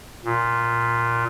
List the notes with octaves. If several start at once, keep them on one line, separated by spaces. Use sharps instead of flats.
A#2